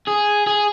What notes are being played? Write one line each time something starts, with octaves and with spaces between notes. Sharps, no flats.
G#4
G#4